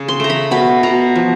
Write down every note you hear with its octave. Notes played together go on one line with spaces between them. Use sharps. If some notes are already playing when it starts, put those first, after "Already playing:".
Already playing: C#3
C6
A3 A#5
B5
B2 B5
B2 A#5
F3